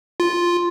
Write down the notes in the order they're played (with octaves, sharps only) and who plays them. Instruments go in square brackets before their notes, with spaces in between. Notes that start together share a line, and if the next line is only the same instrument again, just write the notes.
[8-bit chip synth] F4